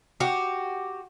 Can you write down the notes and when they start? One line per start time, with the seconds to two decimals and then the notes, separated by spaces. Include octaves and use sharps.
0.20 F#4 G4